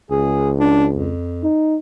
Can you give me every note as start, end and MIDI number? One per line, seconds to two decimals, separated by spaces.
0.11 1.13 37
0.11 0.49 68
0.60 0.87 62
0.95 1.46 41
1.43 1.77 63